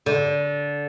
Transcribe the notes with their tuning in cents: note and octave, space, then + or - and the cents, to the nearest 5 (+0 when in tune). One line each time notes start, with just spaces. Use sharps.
D3 -15